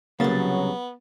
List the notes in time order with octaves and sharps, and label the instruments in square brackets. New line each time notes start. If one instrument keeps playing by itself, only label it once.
[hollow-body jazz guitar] C2 C#3 [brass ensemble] F#3 [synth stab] A#3 A6 [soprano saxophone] B3